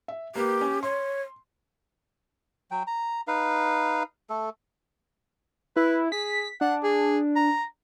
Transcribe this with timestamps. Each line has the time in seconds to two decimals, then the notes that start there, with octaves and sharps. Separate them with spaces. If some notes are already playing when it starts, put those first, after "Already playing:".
0.08 E5
0.36 A#3 G4 B4
0.61 C#4
0.83 C#5 C6
2.71 F#3 G5
2.87 A#5
3.28 D#4 B4 F5
4.30 A3 A4
5.76 E4 B4
6.12 G#4 B6
6.61 D4 F#5
6.84 G#4
7.36 A#5